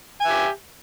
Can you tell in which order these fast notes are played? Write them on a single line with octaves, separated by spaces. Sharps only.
G#5 E5 G4